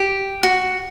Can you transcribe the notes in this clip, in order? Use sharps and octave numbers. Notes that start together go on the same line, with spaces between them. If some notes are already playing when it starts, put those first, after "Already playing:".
Already playing: G4
F#4